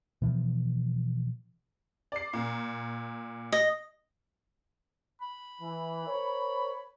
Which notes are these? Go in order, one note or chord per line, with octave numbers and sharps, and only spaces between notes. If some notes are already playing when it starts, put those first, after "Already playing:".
B2 E3 F3
D5 C7
A#2
D#5
B5
E3
A#4 C5 C#5